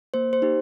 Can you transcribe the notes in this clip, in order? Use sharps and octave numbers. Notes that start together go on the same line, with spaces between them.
A#3 C5
C5
D#4 G4